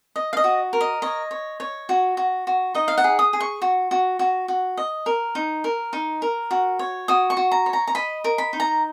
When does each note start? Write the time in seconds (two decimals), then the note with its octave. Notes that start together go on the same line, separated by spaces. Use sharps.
0.16 D#5
0.33 F5
0.37 D#5
0.44 F#4
0.73 A#4
0.81 D#5
1.02 C#5 D#5
1.31 C#5
1.60 C#5
1.89 F#4
2.17 F#4
2.47 F#4
2.75 D#4 D#5
2.88 F5
2.98 F#5
3.04 G#4
3.19 D#6
3.33 G#4
3.40 C#6
3.62 F#4
3.91 F#4
4.19 F#4
4.48 F#4
4.77 D#5
5.06 A#4
5.35 D#4
5.64 A#4
5.93 D#4
6.22 A#4
6.51 F#4
6.79 C#5
7.08 F#4 D#6
7.30 C#6
7.37 F#4
7.52 A#5
7.66 C#5
7.73 A#5
7.87 A#5
7.95 D#5 B5
8.24 A#4
8.38 B5
8.53 D#4
8.60 A#5